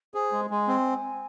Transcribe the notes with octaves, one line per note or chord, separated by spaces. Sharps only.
G#4 C5
G#3
G#3 G#5
C4